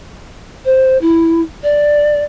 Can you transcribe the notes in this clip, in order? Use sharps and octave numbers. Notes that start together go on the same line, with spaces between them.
C5
E4
D5